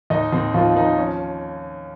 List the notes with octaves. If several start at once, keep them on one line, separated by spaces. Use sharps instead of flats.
D#2 D#4 D#5
D#2 C4 C5
D#2 F3 F4
D#2 D#4
F3 C#4